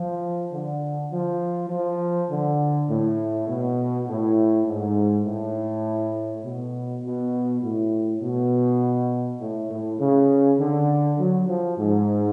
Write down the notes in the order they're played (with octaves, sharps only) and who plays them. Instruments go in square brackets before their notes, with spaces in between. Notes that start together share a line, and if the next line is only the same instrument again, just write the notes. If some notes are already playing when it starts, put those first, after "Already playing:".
Already playing: [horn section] F3
D3
F3
F3
D3
A2
B2
A2
G#2
A2
B2
B2
A2
B2
A2
A2
C#3
D3
F#3
F3
G#2